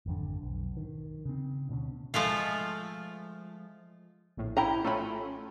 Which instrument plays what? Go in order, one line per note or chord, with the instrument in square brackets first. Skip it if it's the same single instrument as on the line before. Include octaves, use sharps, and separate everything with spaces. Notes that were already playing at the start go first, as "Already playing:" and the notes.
[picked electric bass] G#1 F2 D3
B1
D#3
C#3 C4
D2 B2 C4 C#4
[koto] F3 G#3 A3 F4
[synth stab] A#1 A2
[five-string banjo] E4 G4 A#5
[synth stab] A3 C#4 [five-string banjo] F4 B5